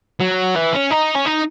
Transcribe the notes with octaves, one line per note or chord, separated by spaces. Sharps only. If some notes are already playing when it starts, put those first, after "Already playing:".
F#3
E3
C#4
D#4
C#4
D#4